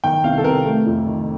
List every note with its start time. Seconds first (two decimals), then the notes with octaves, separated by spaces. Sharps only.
0.04 D#3 G5
0.24 C2 F5
0.38 A4
0.44 C3 A#4
0.66 A3
0.86 F2
1.07 D#3